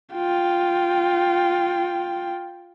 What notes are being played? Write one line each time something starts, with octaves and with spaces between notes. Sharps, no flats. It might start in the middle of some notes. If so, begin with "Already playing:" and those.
F4 G5